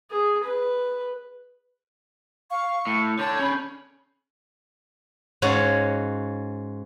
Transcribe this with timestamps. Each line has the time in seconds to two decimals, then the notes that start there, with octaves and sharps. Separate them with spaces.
0.11 G#4
0.44 B4
2.51 F5 C#6
2.87 A2 C#7
3.19 D3 C#5 A5 G6
3.39 C#4 B5
5.42 G#2 C#4 F4 F#4 C#5 F#5